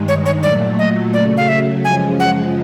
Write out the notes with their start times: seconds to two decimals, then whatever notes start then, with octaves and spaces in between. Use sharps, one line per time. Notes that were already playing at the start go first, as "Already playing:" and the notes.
Already playing: G2 D#3 G#3
0.08 C#5
0.26 C#5
0.43 A#2 F#3 A3 D5
0.79 D#5
1.13 C#3 F#3 A3 D5
1.37 F5
1.48 E5
1.84 F#2 C#3 F3 G#3 G#5
2.20 F#5